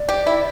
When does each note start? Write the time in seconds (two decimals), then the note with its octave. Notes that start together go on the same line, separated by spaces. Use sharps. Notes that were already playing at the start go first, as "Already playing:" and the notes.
Already playing: D5
0.09 G4
0.27 E4